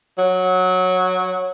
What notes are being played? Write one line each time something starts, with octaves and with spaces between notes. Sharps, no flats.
F#3